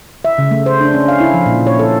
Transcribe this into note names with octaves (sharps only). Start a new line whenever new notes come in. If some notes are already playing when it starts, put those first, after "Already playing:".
E5
C#3
A3
C5
D4
C#4
F5
E4
F3
A#2
C#5
A4